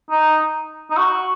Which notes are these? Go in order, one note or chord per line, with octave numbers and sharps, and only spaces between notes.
D#4
D#4
F#4